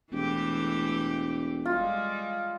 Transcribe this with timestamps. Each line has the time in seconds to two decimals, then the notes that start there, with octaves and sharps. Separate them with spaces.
0.12 E1 E3 A3 G4
1.65 G3 G#3 F4